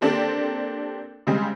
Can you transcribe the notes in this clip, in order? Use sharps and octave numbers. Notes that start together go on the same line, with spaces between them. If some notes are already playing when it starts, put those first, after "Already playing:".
A#3 C4 D4 G4 A4
C#3 G3 G#3 C4